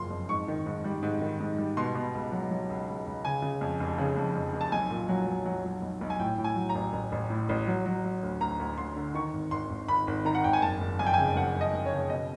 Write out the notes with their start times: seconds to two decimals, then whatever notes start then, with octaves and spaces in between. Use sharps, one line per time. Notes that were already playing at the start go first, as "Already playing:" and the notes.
Already playing: F#1 C#3 F3 C6
0.10 F2
0.29 G#2 C#6
0.48 D#3
0.66 G#2
0.84 G3
1.03 G#2
1.21 D#3
1.40 G#2
1.58 G3
1.77 B2 C6
1.95 B2
2.14 C#2
2.32 F#3
2.50 F#3
2.69 C#2
2.88 C#2
3.06 C#2
3.24 C#3 G#5
3.42 C#3
3.61 F2
3.80 F1
3.98 C#3
4.17 F2
4.35 F2
4.53 F1
4.61 A5
4.72 B1 G#5
4.90 A#2
5.09 F#3
5.27 F#3
5.46 F#3
5.65 F#3
5.82 B1
6.01 B1
6.10 G#5
6.19 A2 G5
6.38 A2
6.44 G#5
6.56 F#3
6.69 A#5
6.75 A1
6.93 A1
7.12 A1
7.30 A2
7.49 A1
7.67 F#3
7.86 F#3
8.05 F#3
8.23 D2
8.41 D2 A#5
8.59 D2
8.78 D2 C6
8.96 D3
9.15 D#3 C#6
9.33 G#1
9.51 G#1 C6
9.70 G#1
9.88 G#1 B5
10.07 G#1
10.25 D#3 A#5
10.35 F#5
10.44 G#1 G5
10.53 G#5
10.62 F#1 A5
10.80 F#1
10.99 F2 G#5
11.07 G5
11.14 C#3 G#5
11.36 F#1 F#5
11.55 F#1
11.61 D#5
11.74 F#1
11.86 C#5
11.92 C#3
12.09 B2 D#5